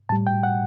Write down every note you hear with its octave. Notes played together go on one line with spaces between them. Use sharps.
A2 G3 A5
G5
F#5